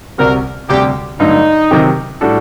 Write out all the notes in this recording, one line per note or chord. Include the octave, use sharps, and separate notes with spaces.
C2 C3 G3 C4 F#4 A#4
D2 C3 G3 G4
G2 D3 F#3 A3 D#4
C3 D#3 F#3 C4 G4
A2 G3 D4 F#4 A4